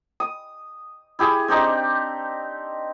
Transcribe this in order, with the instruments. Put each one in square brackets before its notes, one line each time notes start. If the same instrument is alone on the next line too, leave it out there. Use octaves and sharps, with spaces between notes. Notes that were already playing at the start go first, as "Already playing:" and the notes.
[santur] D#6
E4 G4 G#4
C4 D4 D#4 G4